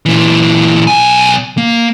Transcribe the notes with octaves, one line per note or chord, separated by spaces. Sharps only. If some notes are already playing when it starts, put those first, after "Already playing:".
A#2 E3
B1 G#5
A#3